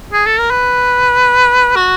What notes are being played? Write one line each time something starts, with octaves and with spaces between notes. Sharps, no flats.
G#4
A4
A#4
B4
F#4